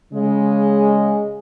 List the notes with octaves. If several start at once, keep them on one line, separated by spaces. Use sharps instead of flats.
C#3 G#3